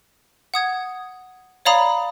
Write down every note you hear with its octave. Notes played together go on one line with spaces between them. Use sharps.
F#5 D#6 G#6
C#5 D5 F5 A#5 B5 D#6